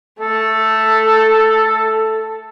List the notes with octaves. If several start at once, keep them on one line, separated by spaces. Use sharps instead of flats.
A3 A4